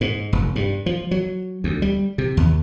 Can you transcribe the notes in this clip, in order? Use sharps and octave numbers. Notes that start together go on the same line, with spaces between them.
G#2
F1
G2
F3
F#3
D2
G3
C3
D#2